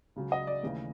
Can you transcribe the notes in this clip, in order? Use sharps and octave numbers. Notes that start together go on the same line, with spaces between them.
C#2 C#3 F#3
D#5
D5
D#2 C#3 E3 A3